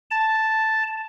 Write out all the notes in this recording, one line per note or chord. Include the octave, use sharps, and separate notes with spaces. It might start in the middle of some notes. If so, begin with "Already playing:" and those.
A5